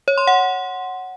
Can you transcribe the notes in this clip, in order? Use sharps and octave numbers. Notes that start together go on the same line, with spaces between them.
C#5
C6
F#5